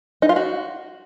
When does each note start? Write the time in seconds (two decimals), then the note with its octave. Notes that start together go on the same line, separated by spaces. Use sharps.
0.22 D#4
0.29 F4
0.36 F#4